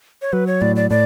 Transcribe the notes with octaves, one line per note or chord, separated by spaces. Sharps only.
C#5
F#3 B4
C#5
A2 D5
D5
A2 D5